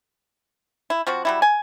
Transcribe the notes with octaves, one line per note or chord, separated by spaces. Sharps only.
E4
F3 C4 F#4
F#3 G3 E4
G#5